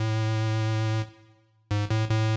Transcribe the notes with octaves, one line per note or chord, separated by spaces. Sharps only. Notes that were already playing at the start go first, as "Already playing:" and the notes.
Already playing: A2
G#2
A2
A2